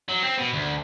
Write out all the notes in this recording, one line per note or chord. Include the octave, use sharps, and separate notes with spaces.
F#3
C4
B2
D2